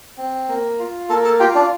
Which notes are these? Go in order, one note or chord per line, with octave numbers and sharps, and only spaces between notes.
C4
A#3
F4
A#3 A4 A5
A4 A5
F4 G4 G5
D4 D5